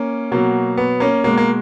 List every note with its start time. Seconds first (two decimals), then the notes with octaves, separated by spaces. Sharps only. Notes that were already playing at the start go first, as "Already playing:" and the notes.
Already playing: A#3 C#4
0.31 B2 F#3 A#3
0.77 B3
1.00 A#3 C#4
1.24 B2 G#3 A#3
1.37 A#3